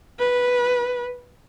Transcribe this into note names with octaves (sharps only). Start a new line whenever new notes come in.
B4